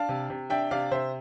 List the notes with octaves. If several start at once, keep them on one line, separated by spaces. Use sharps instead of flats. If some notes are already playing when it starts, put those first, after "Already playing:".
Already playing: D4 F5 A5
C3
C3
D4 E5 G5
C3 D5 F5
C3 C5 E5